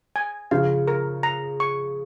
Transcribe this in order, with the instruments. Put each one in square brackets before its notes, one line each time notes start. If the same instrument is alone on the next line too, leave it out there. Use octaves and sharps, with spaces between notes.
[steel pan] G#5
[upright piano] C#3 F3 [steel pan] F5
[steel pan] A#4
A#5
C#6